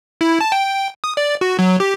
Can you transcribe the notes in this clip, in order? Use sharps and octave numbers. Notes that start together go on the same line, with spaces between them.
E4
A5
G5
D#6
D5
F#4
F#3
G4